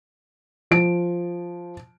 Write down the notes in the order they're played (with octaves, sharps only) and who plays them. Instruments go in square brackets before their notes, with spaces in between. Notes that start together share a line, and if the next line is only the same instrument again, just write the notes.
[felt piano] F3 D7